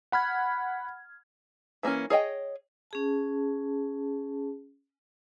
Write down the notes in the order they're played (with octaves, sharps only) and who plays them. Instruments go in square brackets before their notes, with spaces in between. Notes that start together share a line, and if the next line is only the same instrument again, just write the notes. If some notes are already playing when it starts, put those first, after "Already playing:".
[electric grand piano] F#5 B5 F6 G#6
[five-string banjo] E3 A#3 B3 C#4
G#4 C#5 D#5 G5
[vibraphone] C#4 G#4 A5